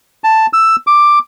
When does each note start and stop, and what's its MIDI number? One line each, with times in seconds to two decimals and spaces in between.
0.24 0.46 81
0.53 0.76 88
0.87 1.19 86